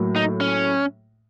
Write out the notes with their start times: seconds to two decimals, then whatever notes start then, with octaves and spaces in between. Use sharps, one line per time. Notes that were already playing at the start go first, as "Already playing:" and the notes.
Already playing: A2 F#3 A#3
0.16 D#4
0.41 C#4